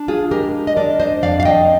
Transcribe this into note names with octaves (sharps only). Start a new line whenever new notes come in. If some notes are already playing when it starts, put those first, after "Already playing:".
Already playing: D4
F4 G#4
G#3 G4 A#4
D#5
D4 A#4 D5
C5 D#5
F2 D5 F5
F5
D#5 G5